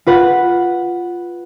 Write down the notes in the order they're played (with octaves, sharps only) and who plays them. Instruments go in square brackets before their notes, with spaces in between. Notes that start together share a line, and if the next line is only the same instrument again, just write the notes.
[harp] F4 B4 F#5